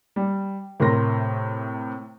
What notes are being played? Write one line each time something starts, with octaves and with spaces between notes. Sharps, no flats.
G3
A2 C3 A#4 C6 A#6